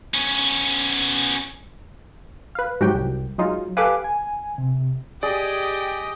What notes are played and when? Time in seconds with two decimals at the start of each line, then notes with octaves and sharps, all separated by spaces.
0.14 B3 C#4
2.55 B4 F5
2.81 G#2 F#3 F#4 G4 G5
2.94 C2
3.39 F#3 G#3 D#4 F4
3.77 G4 A4 B4 F5 G#5 D6
4.04 G#5
4.58 C3
5.23 G4 G#4 D5 D#5 G5